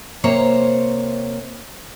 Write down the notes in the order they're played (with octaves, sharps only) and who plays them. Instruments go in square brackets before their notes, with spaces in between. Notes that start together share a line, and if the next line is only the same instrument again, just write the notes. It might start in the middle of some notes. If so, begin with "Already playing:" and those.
[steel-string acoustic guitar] C3 A#3 C5 C#5 A#5